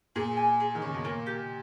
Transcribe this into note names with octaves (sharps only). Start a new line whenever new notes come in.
A#2 G#4
G#5
G#4
D#3
C#3 C#5
B2
A#2 A#3
G4